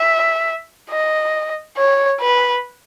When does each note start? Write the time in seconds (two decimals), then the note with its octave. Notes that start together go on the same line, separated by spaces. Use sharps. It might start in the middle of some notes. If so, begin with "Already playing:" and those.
Already playing: E5
0.90 D#5
1.77 C#5
2.21 B4